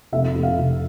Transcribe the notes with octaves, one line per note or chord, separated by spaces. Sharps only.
F1 E5
F1
F5
F1